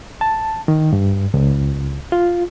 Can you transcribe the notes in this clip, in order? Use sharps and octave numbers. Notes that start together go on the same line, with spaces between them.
A5
D#3
G2
C#2
F4